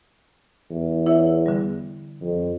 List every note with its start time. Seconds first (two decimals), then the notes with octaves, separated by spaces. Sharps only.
0.70 E2
1.06 E4 C#5 E5
1.46 D3 G3
2.21 F2